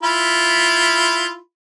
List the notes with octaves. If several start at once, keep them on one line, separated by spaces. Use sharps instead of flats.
E4 F4 B5